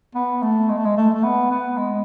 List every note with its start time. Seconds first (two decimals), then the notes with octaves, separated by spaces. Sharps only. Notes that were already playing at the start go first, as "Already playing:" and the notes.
0.15 B3
0.43 A3
0.69 G#3
0.78 A3
0.85 G#3
0.97 A3
1.13 A3
1.24 B3
1.51 B3
1.77 G#3